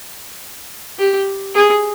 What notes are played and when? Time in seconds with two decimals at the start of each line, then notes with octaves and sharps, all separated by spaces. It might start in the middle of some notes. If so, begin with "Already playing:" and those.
0.99 G4
1.55 G#4